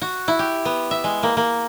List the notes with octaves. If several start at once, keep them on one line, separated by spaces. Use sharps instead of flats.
F#4
E4
G4
B3
E5
G#3
A#3
A#3